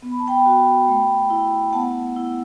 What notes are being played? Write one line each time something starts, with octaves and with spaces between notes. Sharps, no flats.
B3
B5
A5
G5 B5
F#4
A3
E4
B3 F#5 A5
E4